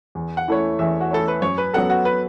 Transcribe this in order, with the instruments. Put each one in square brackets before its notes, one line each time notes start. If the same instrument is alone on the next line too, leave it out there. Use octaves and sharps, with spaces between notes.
[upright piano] E2
[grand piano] F#5
[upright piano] E3 A3 E4 C#5
[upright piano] E2 [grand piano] E5
[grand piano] F#4
[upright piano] E3 A3 E4 C#5 [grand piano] A4
[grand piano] B4
[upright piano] F#2 [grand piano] C#5
[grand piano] B4
[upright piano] F#3 B3 F#4 A4 [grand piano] F#5
[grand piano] F#4
B4